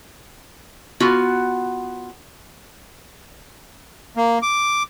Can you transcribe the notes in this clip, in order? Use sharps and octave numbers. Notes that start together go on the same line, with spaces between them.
B3 F4 F#4
A#3
D6